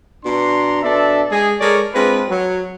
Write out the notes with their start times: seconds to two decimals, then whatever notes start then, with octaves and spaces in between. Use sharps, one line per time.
0.24 B2 D4 A#5 C6
0.82 B2 D4 A4 D5 E5
1.31 G#3 G#4
1.59 G#3 A4 A#4 C#5 D5
1.94 G#3 C4 D4 F4 B4
2.28 F#3